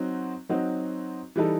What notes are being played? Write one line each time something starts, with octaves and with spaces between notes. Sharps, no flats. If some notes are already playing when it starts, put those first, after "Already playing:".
Already playing: F#3 C4 D#4 F#4
F#3 C4 D#4 F#4
E3 G3 D#4 A4